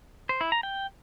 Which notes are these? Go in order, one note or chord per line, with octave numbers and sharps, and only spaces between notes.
C5
E4
A#5
G5